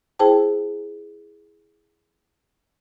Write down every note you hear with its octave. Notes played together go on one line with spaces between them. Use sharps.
E4 G#4 C5 G5 A5